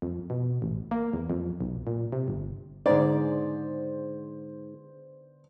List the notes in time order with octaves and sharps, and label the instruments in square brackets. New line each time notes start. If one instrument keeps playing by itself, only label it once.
[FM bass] F2
B2
A1
A#3
E2
F2
B1
A#2
C3
G1
[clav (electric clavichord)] G#2 [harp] D3 B3 G#4 [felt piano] C5 [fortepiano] D5